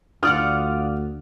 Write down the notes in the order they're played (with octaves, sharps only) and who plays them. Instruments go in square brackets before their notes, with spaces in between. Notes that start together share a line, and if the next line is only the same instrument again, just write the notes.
[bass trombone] D2 [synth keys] F4 D5 F#5 [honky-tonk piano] D#6 F6